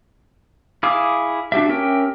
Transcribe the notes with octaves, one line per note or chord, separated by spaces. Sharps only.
E4 G#4 F5 D6
D4 F#4 G4 E5
C#4 G4 A#4 E5 G5